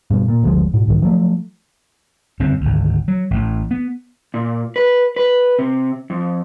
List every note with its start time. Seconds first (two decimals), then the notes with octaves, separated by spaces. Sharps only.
0.10 G2 B2
0.28 A#2
0.43 F#1 D2 F3 G#3
0.74 G#2 B2
0.88 C2 G#2 D#3
1.02 F3 F#3 G#3 A3
2.39 G1 F#2 C#3 C4
2.61 G#1 D2
3.08 F#3
3.31 A1 A2
3.71 B3
4.34 A#2
4.76 B4
5.16 B4
5.59 C3
6.10 F2